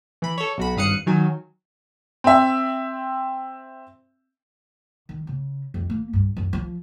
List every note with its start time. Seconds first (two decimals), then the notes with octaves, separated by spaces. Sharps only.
0.22 E3 B5
0.38 A4 C#5
0.58 B1 F#4 B5
0.76 G#1 G2 F5 D#6 F#6 C#7
1.06 D#3 F#3 G#5
2.24 C4 E5
5.09 D#3
5.27 C#3
5.74 F2
5.90 A#3
6.13 G2
6.37 F#2
6.53 F3